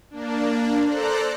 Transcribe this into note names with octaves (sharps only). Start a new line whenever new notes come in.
A#3 D4
A4 C5 D5 A#5 F#6